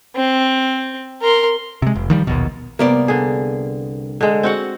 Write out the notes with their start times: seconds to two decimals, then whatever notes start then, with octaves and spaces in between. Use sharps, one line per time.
0.16 C4
1.22 A#4 C6
1.82 C3 G#3
1.95 F1
2.10 D#3 F3 G3
2.27 A#1 D#2 B2
2.79 C2 A#3 B3 D5
3.08 D3 G#4
4.21 D3 G#3
4.43 C4 F#4 F#5